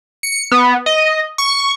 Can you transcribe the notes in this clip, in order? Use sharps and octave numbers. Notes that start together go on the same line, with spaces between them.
C#7
B3
D#5
C#6